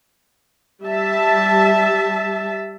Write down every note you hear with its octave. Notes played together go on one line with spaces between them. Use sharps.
G3 E5 A5